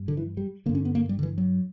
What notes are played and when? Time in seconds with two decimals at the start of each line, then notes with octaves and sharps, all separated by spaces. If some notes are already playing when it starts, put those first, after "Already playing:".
Already playing: G2
0.08 D3
0.17 E3
0.37 G3
0.66 D3 A#3
0.69 G2
0.75 C#4
0.85 B3
0.95 A#3
1.09 G3
1.19 D3
1.23 E3
1.38 F#3